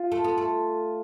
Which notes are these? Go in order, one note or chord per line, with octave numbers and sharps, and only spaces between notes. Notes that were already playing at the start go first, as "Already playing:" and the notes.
Already playing: F4
A3
B3
A3